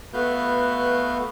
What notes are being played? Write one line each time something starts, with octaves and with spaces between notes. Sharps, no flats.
A3 B3 F#4 B4 F5 G6